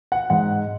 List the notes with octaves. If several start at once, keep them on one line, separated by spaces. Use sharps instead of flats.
F#5
G#2 F#5